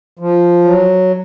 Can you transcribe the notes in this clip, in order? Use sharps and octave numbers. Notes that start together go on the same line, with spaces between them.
F3
F#3